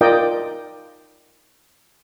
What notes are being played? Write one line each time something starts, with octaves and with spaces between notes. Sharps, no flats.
D#4 F4 A#4 D5 D#5 G5